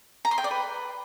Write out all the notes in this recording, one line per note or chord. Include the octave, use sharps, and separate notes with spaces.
A#5
C6
G5
D5
B4